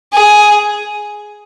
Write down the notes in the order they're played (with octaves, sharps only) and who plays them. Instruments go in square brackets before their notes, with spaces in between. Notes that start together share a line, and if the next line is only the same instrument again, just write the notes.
[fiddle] G#4